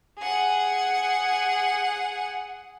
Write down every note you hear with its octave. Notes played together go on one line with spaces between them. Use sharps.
G#4 F#5